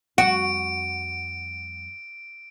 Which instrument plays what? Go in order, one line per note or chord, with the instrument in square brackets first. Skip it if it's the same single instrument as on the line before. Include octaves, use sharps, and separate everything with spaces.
[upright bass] F2 G3 [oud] F#4 [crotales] D7